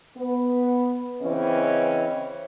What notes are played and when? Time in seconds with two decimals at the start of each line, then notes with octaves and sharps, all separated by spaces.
0.16 B3
1.21 C#3 E3 C4 C#4 D#5